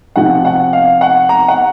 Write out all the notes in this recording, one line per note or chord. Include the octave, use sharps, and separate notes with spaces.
C3 F3 C4 F#5
F#5
F5
F#5
A#5
F#5